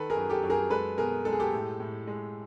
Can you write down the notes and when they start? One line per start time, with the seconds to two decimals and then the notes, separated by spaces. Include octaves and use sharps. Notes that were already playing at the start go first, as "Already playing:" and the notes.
Already playing: D#3 A4 B4
0.10 G#4 A#4
0.16 F#2
0.30 G4 A4
0.43 F#2
0.50 G#4 A#4
0.70 G#3 A4 B4
0.97 B2 G#4 A#4
1.25 G#3 A4
1.32 G#4
1.40 G4 A4
1.53 A2
1.80 A2
2.07 G#3